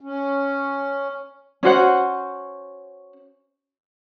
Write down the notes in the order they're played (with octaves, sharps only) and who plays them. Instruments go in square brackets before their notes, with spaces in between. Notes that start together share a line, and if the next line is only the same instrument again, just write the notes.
[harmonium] C#4
[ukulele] C#4 F#4 C5 F#5